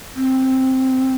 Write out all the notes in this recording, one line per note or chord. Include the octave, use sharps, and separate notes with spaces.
C4